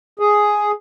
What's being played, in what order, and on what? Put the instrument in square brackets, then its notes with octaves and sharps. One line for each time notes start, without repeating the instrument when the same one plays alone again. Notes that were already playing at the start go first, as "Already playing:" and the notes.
[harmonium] G#4